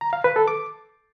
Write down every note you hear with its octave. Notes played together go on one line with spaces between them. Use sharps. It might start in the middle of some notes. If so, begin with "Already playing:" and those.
A#5
F5
B4
A4
D6